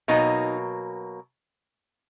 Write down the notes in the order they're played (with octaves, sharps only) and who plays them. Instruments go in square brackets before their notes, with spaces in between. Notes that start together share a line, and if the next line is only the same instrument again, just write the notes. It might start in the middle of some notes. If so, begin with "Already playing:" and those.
[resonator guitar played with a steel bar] B2 F#3 A#3 D#4